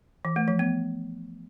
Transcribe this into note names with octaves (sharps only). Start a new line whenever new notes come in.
E3
A3
F3
B3